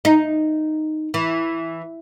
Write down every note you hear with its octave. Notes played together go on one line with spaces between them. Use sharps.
D#4
E3